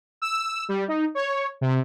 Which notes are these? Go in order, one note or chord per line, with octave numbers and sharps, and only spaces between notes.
E6
G3
D#4
C#5
C3